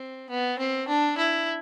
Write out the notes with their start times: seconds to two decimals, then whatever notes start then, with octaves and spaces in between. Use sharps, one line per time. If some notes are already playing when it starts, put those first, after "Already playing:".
Already playing: C4
0.30 B3
0.59 C4
0.88 D4
1.18 E4